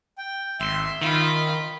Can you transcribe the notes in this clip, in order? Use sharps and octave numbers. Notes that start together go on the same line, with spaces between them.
G5
G#1 E5 C6
D#3 F4 B5
D#5